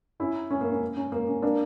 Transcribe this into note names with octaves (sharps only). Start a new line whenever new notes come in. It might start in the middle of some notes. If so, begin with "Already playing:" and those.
C#4 E4
C#4
A#3
C#4
C#4
A#3
C#4
A#3 D4